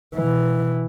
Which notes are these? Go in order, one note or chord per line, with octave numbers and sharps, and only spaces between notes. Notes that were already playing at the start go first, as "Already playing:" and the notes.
B2 E3